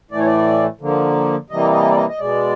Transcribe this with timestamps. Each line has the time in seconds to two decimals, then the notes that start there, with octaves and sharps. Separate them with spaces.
0.11 A2 E3 A3 D5
0.19 C#5
0.26 D5
0.81 D3 F3 A#3
1.50 C3 E3 G3 A#3 D#5
1.73 D#5
1.91 D5
1.97 D#5
2.09 D#5
2.19 B2 G#3 D5